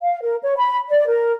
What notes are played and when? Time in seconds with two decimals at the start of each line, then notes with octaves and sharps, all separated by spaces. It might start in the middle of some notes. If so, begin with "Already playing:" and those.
0.01 F5
0.21 A#4
0.43 C#5
0.57 B5
0.89 D5
1.07 A#4